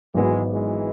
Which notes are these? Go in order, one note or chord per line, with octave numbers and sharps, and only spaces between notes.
G#1 G#2 E3 F#3 G#3 B3 F#4
E3 G#3